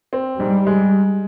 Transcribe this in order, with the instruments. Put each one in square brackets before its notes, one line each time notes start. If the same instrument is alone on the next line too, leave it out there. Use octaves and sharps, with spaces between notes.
[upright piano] C4
[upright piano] G#2 [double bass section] G3
[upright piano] G#3